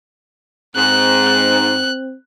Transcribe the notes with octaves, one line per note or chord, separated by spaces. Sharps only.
G#2 C4 F#6